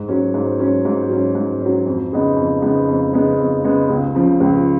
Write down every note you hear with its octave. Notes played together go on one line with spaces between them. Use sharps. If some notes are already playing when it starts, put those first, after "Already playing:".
Already playing: G#2
F#3 C#4
G#2
F#3 C#4
G#2
F#3 C#4
G#2
C#4
F#3
F2
C#3 G#3 B3 D#4
F2
C#3 G#3 B3 D#4
F2
C#3 G#3 B3 D#4
F2
C#3 G#3 B3 D#4
C#2
C#3 F3
C#2